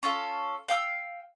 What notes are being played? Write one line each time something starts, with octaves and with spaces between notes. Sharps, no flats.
C#4 F4 A4
F5 G5 D#6 E6